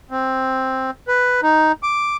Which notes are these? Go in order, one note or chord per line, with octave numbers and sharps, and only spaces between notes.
C4
B4
D#4
D6